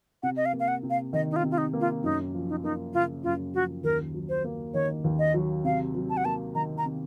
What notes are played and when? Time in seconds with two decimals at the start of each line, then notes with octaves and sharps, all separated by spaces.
0.23 C3 F#5
0.37 D#5
0.46 F5
0.53 A#3
0.60 F5
0.68 F#5
0.83 C3
0.90 F5
1.13 D#3 D#5
1.31 D#4
1.36 F4
1.43 C3
1.51 F4
1.58 D#4
1.73 A#3
1.81 F4
2.04 F#2 D#4
2.34 F3
2.49 D#4
2.63 A#3 D#4
2.94 C#3 F4
3.24 F#2 F4
3.54 F3 F#4
3.84 D#2 A#4
4.14 F#3
4.29 C5
4.44 A#3
4.74 D#3 C#5
5.04 D#2
5.19 D#5
5.34 F#3
5.65 C3 F5
5.95 F#3
6.10 A5
6.17 F#5
6.25 A#3 A5
6.55 D#3 A#5
6.78 A#5
6.85 C3